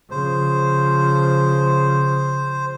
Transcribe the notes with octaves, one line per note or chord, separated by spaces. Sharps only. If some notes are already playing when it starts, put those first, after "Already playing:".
C#3 F3 C5